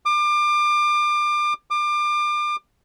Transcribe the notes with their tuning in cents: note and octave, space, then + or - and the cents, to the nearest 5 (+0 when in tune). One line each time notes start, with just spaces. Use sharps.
D6 +30
D6 +30